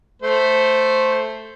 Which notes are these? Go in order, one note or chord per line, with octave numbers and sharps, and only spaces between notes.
A3 C5